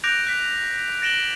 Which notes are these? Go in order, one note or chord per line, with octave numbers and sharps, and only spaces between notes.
D6 F#6 G6 A#6 D7 F7
F#6 B6
A6 A#6 D7 E7 F#7 G7